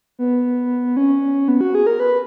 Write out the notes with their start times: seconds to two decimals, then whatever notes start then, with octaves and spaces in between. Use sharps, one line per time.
0.19 B3
0.97 C#4
1.48 B3
1.61 F#4
1.75 G#4
1.87 A#4
2.00 B4